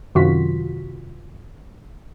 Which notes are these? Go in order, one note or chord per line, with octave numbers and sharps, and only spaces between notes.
F#2 C3 D#3 F4 F#4 B6